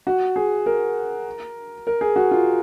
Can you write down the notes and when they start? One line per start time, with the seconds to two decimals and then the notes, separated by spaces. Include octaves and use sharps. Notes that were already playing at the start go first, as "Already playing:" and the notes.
0.07 F#4
0.36 G#4
0.66 A#4
1.87 A#4
2.01 G#4
2.16 F#4
2.31 F4